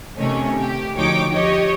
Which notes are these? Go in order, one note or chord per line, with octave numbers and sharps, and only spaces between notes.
C3 D#3 A3 C#4
G4
D2 F3 D#4 C#5 G5 D6
G4 C#5 D#5